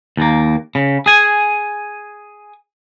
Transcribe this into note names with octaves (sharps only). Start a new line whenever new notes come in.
D#2 A#3
C#3
G#4 G#5